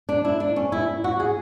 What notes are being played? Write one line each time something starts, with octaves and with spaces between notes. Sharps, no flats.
D4
E4
D4
C#4
E4
F#4
G#4